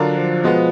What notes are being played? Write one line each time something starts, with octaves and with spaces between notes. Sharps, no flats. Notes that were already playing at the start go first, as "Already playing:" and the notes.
Already playing: D3 F#3 D4 F4 A#4
F3
B2 G#3 B3